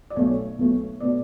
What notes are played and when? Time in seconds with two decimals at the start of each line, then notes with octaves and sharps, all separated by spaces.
0.10 D5
0.16 B1 B2 A3 C#5
0.59 B1 B2 A3
1.00 B2 A3 D5